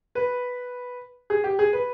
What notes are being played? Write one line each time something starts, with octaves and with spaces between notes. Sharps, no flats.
B4
G#4
G4
G#4
B4